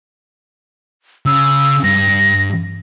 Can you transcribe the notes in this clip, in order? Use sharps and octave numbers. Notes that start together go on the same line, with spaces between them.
C#3 E6
G2 A#6